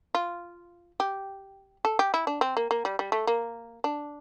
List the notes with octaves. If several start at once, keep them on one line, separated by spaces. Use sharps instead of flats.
F4
G4
A4
G4
E4
D4
C4
A#3
A#3
G3
G3
A3
A#3
D4